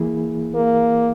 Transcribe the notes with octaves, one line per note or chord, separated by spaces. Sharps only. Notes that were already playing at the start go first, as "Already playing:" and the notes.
Already playing: E3 A#3 E4 G#4
A#3